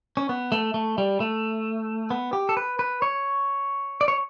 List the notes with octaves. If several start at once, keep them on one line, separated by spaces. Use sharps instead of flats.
C#4
B3
A3
A3
G3
A3
B3
G4
A4
B4
B4
C#5
D5
C#5